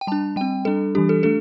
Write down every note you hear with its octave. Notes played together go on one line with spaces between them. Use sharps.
G5
G3 D4 A5
G3 C4 G5
G3 D4 A4
E3 G3 D4 G4
A4
A3 D4 A4